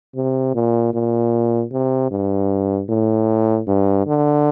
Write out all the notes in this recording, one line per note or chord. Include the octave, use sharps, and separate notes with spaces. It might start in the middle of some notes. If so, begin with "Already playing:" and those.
C3
A#2
A#2
C3
G2
A2
G2
D3